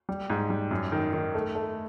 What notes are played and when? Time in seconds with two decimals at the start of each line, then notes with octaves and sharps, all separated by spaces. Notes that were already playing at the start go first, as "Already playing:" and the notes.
0.09 G3
0.30 G#2
0.50 G3
0.71 F#2
0.92 D#3
1.13 D#3
1.34 A3
1.55 A3